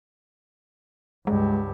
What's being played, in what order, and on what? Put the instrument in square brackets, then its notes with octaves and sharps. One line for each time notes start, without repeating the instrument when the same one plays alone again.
[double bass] C#2 G2 [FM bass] G#3